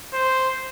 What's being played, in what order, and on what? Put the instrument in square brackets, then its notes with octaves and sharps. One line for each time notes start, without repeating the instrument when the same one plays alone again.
[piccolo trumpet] C5